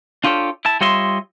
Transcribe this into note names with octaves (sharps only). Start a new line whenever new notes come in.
D4 F4 G4 A4 C#5
E4 A5
G3 F4 C#5 D#5 E5 C6